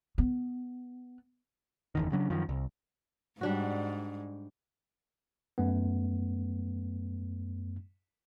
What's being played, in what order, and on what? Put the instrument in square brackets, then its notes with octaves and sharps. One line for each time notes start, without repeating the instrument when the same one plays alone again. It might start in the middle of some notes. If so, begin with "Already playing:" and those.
[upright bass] B3
[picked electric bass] F#1 E2 D#3
C#3 F#3 D4
F#2 D#3 F3
C2
[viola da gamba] G#2 [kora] G3 D4 F#4
[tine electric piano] F#2 A3 B3